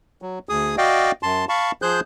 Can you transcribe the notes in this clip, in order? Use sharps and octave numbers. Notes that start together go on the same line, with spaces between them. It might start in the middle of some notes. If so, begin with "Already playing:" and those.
F#3
D2 G#4 D#6
F#4 D5 D#5 F5 G5
F#2 A5 C6
F5 A5 B5 C#6
F3 G#4 C5 F#6 G6